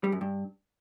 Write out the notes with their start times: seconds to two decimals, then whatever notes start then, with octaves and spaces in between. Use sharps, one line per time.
0.04 G3
0.12 F#2
0.21 G2